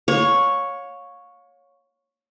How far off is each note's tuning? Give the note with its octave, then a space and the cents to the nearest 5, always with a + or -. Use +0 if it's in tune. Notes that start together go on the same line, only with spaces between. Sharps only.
C#5 +0 F5 +35